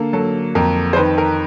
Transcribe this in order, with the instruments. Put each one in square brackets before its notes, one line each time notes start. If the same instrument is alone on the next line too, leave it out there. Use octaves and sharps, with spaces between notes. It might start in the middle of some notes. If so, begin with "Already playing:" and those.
Already playing: [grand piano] D3 A#3 A4
F#3 A4
F2 A#4
C5
D#3 B4
A#4